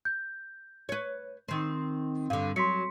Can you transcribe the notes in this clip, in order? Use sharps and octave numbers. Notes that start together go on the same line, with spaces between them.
G6
B4 C#5
D#3 C4
G2 D3 F5
F#3 C6 B6 C#7